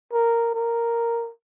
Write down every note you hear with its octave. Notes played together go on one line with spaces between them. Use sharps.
A#4
A#4